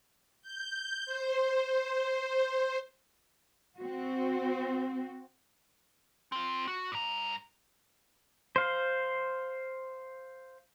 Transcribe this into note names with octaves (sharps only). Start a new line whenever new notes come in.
G6
C5
C5
C4 F#4
C4 F4
F#4
G2 A#5
C5 F5